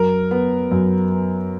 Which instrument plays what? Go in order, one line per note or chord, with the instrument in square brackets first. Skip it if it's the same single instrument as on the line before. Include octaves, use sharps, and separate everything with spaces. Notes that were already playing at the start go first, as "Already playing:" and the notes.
Already playing: [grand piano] F#2 A#4
B3
F#2
B3